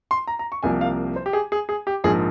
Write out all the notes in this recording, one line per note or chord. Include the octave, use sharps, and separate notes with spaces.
C6
A#5
A#5
C#6
C2 C3 F3 A#3 G#5
F5
C5
G4
G#4
G#4
G#4
G4
A#1 G#2 F3 A#3 G#4